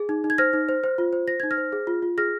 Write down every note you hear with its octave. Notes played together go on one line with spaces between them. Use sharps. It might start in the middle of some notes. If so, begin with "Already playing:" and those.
Already playing: G#4
D#4
D#4
G#6
C5 F6 A#6
D#4
C5
C5
F4
C5
C5 A#6
D#4 G#6
F6 A#6
C5
G#4
F4
F4
G#4 F6 A#6